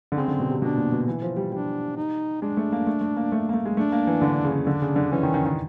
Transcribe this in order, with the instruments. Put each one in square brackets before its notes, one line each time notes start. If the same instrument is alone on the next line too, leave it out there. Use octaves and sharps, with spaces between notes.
[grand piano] D3
[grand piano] C#3 [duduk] C4
[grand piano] D3
B2
C3
[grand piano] B2 [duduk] D4
[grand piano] A#2
B2
E3
F3
G3
[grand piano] G3 [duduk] D4
[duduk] D#4
[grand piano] G#3 [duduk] D4
[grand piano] A3
A#3
A3
A3
A#3
A3
A#3
A3
G#3
[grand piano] A3 [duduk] D4
[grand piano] A#3
E3
D3
C#3
[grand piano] D3 [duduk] D4
[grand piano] C#3
D3
[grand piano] E3 [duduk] C#4
[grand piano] D#3
D#3
D#3